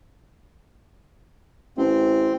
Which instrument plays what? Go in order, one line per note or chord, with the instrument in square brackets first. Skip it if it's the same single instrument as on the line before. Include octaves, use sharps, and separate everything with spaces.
[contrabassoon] A1 [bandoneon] C4